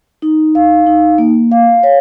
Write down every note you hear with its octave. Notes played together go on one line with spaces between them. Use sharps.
D#4
F5
D#4
A#3
F5
C#5